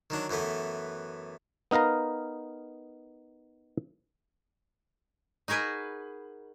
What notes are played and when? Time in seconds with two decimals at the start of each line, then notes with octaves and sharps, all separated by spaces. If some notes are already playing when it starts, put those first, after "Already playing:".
0.10 D#3 F#3 D4
0.30 F#2 E3 A3 B3
1.71 B3 D#4 A#4 F5 A#5
5.48 D#4 F#4 G#4 A#4 B4